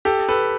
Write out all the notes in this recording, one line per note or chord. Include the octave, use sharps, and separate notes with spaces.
G4 A4
A4 B4